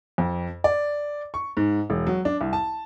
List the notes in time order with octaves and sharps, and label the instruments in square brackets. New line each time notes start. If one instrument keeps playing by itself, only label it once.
[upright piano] F2
D5
C#6
G#2
E1
F#3
D4
C2
A5